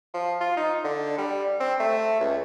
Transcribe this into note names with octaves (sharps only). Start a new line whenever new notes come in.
F3
F4
D#4
D3
G3
C4
A3
C#2